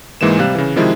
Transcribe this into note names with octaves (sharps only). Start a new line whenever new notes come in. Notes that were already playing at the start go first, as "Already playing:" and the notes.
G#2 E3 G#3 A#3 E7
C3 G3 F5 F#6
C#3 E3
C3 D#3 F3 G#3 E4